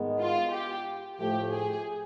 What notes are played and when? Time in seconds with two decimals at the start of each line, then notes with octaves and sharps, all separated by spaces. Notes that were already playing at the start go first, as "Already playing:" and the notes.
Already playing: G#2 D#3 G#3 B3
0.22 F4
0.54 G4
1.20 A2 F3 A3 G4
1.53 G#4